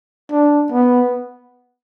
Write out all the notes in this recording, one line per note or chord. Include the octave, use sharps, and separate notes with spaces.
D4
B3